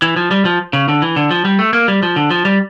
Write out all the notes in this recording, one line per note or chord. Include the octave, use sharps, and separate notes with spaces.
E3
F3
G3
F3
C#3
D3
E3
D3
F3
G3
A3
A#3
G3
F3
D3
F3
G3